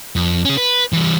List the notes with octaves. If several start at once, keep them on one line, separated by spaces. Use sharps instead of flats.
F2
C#4 G#4
B4
E3 G3